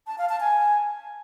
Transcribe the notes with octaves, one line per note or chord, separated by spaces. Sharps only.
A5
F5
A5
G#5